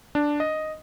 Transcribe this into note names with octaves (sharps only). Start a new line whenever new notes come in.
D4
D#5